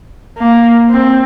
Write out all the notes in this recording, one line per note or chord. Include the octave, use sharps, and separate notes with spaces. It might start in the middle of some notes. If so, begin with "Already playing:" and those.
A#3
C4